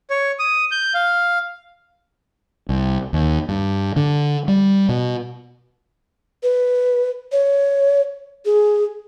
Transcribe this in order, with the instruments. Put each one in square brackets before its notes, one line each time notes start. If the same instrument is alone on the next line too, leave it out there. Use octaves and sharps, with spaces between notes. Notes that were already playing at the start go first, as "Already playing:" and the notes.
[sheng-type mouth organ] C#5
D#6
G6
F5
[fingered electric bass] C2
D#2
G2
D3
G3
B2
[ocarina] B4
C#5
G#4